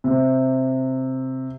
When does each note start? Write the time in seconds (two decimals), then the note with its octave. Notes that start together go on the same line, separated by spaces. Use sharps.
0.04 C3